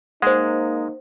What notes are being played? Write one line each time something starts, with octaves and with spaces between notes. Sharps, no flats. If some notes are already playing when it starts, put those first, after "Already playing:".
G#3 A#3 D#4 C5 F#5